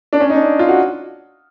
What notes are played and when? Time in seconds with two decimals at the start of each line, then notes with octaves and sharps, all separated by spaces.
0.13 D4
0.20 C#4
0.30 D#4
0.35 D4
0.59 F4
0.69 F#4